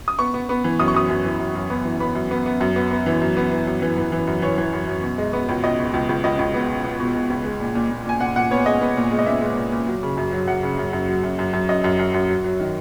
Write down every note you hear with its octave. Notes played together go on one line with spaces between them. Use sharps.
D#6
B3 C#6
B3
B3
E3
F#2 D#6
C#6
F#2 D#6
F#2
E3
F#2
F#2
B3
E3
B3 B5
F#2
B3
B3
F#2
B3
B3
E3
F#2
B3
E3
F#2
E3
E3
E3
F#2
E3 C#5
E3
F#2
F#2
B2
G#3
B3
C#2
C#2 D#5
B2
C#2
C#2
C#2 D#5
C#2
B3
B2
B3
B2
B2
C#2
G#3
A#2
A#2
A#2
A#2 G#5
A#2 F#5
A#2 F#5
B3 C#5
G#3 D#5
B3
A#2
G#3
D#5
A#2 E5
G#3
A#2
A#2
F#3
C#3
F#2
F#3
F#2 F#5
C#3
F#2
F#2
F#3
F#2
F#2
F#2
F#2 D#5
F#2
F#2
F#2
F#3
F#3
D#3